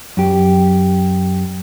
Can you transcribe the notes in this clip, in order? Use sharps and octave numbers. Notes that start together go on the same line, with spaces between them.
F#2 G4